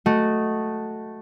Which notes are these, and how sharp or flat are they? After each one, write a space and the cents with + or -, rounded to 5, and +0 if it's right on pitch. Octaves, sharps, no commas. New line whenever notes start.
A3 +0 F#4 +0 D#5 +0